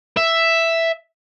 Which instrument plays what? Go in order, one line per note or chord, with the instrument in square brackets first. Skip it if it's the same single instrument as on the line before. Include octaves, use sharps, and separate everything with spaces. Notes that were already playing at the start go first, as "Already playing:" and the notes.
[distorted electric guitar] E5